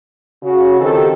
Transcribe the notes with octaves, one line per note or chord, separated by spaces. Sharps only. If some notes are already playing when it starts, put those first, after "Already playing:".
C#3 F#4
D#3 F3 C4 G4 A4